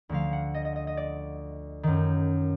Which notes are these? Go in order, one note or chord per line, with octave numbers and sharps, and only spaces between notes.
D2 D3 F3 F5
F#5
D#5
D#5
D#5
D#5
D5
F#2 D#3